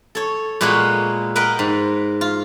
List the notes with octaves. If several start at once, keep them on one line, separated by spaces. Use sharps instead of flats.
A4 C#5
A#2 G#3 A#3 B3 F#4 C#5
A#4 B4 D#5 F#5 G5
G#2
F4